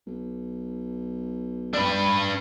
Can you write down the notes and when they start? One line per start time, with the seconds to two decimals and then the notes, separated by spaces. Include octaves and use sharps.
0.07 B1
1.73 D4 B4